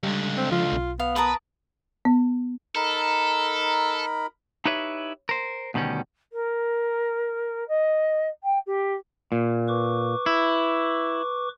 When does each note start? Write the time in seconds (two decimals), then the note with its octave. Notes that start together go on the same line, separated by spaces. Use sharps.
0.03 C#2 D3 G3
0.37 C4
0.52 F3 F4
0.72 B1
1.00 B3 F5
1.16 A#4 B4 A5 D#6
2.05 B3
2.75 D#4 A4 A#4 B5
4.65 D#4 E4 G4 B4 C#5 E5
5.29 A#4 C5
5.74 D2 B2 D#3 G3 C#4
6.33 A#4
7.68 D#5
8.43 G5
8.66 G4
9.32 A#2
9.68 B4 C#6 D6
10.26 E4